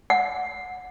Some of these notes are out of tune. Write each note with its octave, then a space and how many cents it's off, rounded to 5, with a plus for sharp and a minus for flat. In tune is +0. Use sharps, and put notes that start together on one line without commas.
F#5 -15